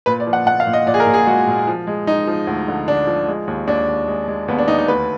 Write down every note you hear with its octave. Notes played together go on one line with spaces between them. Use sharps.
A#2 B4
D5
F3
F#5
A#2 F#5
F5
A#2
D#5
A#2 D5
G#4
A#4
A#2
G#4
G#3 F#4
A#2
F3
G#3
G#3 D#4
F3
D2
D3
D3 D4
F3
G#3
D#2
D#2 D4
D#2
G#3
G#3
D#2 B3
D4
D#2 D#4
D#4
D2 B4